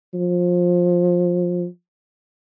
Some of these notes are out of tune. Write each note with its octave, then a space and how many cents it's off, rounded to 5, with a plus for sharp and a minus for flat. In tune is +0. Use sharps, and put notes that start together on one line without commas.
F3 +20